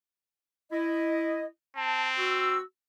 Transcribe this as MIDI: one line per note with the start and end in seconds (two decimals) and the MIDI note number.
0.71 1.45 64
0.71 1.45 75
1.76 2.58 60
1.76 2.09 81
2.18 2.61 66
2.18 2.61 88